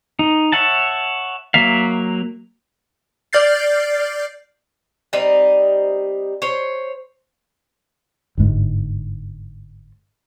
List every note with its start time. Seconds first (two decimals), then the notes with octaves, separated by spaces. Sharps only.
0.19 D#4
0.52 C#5 E5 F#5 A5
1.54 F#3 A#3 E5 F5
3.33 D5 F6 G6 A6 C7
5.13 G3 C4 D#4
6.42 C5 C#5
8.38 G1 G#2